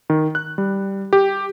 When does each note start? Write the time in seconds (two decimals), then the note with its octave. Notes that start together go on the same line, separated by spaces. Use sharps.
0.10 D#3
0.35 F#6
0.58 G3
1.13 G4